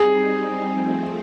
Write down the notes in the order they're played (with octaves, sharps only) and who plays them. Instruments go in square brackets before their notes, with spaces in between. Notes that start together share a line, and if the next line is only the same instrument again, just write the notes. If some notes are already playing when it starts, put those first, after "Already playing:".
Already playing: [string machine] G3 C4 D#4 [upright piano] G#4
[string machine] F3 A3 C4